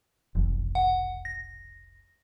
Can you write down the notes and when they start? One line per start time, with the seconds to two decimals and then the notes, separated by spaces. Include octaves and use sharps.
0.35 F1 B1 E3
0.75 F#5
1.25 A#6